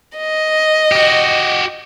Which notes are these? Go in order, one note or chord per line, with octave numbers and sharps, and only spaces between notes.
D#5
F#4 G4